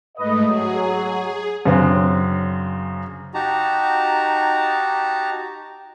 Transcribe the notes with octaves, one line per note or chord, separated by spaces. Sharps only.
G#2 A3 B4 D#5
F#3 G#4
F#2 C#3 C4 D4
D#4 F#4 G4 A5 A#5